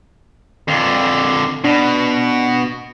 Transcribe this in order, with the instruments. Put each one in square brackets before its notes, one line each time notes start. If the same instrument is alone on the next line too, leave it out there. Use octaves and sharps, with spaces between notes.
[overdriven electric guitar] F2 D3
[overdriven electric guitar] B2 [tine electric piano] D4